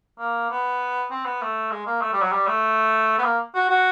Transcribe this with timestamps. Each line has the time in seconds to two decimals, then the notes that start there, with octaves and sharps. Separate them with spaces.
0.19 A#3
0.50 B3
1.11 C4
1.25 B3
1.42 A3
1.71 G#3
1.86 A#3
2.01 A3
2.13 G3
2.22 F#3
2.32 G3
2.47 A3
3.18 B3
3.24 A#3
3.55 F#4
3.69 F#4